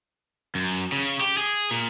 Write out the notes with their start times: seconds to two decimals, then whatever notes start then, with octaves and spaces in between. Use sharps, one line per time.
0.55 F#2
0.92 C#3
1.21 G4
1.37 G#4
1.71 A#2